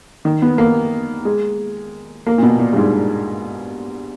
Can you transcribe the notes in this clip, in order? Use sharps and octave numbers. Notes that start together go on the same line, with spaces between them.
D#3
B3
A#3
G#3
A#3
A#2
B2
A#2
G2
G#2